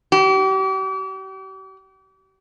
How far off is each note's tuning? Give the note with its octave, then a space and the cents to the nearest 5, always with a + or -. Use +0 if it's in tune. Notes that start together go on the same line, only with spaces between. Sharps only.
G4 -40